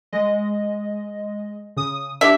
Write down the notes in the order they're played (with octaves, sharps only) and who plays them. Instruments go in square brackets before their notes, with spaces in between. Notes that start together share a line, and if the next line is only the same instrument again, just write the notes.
[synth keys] G#3 D#5
C#3 D#6
[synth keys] D4 G4 [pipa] E5